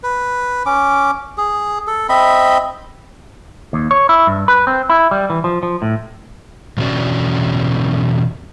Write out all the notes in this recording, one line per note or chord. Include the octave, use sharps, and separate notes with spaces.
B4
C#4 D6
G#4
A4
C4 D#5 E5 B5
D#2
C#5
E4
G2
B4
C4
E4
G3
E3
F3
F3
A2
E2 B2 D3 C#4 F#4 D5